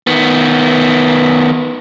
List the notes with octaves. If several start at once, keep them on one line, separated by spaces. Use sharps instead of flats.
D#3 B3